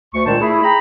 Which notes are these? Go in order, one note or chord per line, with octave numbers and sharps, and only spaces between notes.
D2 C#6
C#2 A#2 D#3 D4 C5 A5
A3 E4 G#4
G#4 G5 A#5 B5